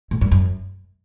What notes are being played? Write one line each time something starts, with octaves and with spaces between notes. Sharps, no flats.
A2
G2
F#2